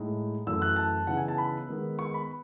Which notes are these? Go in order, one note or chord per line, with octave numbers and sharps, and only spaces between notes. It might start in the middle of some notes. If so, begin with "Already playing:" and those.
Already playing: A2 G#3 D#4
F#2 E3 A3 C#4 E6
F#6
A5
C#3 E3 B3 D#4 F#5
G#5
A5
B5
D#3 G#3 B3 D#4
C#6
B5